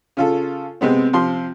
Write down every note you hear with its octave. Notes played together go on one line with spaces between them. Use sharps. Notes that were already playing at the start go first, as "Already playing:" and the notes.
C#3 F4 A4
C3 G#3 B3 C4
C3 F3 C6